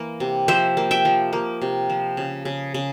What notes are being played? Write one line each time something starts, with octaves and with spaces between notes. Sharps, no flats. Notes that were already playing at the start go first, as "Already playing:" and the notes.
Already playing: E3 A#3
C3
F3 C5 E5
A#3
E5 G5
F3
A#3
C3
F3
C#3
C#3
C#3